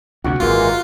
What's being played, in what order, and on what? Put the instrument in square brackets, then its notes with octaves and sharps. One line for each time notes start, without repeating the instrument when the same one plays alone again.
[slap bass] D2 C3 [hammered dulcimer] F#4
[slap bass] G#1 F#2 [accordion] E3 G#3 A#3 [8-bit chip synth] F4